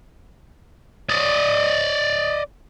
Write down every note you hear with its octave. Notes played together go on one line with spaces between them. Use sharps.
D5 D#5